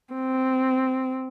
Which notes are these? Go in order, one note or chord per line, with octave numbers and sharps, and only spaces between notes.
C4